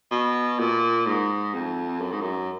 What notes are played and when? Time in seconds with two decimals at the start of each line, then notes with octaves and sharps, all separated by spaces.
0.11 B2
0.59 A#2
1.06 G#2
1.54 F2
2.01 F#2
2.12 G#2
2.22 F#2